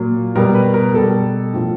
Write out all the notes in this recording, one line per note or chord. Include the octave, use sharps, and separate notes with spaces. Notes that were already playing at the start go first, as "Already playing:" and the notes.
Already playing: A#2 F#3
B2 G3 A#4
B4
A#4
B2 G3 A4
A2 F3